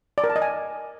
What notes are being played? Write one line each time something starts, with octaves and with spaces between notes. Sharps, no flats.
D5
A#4
A5
D#5
G#5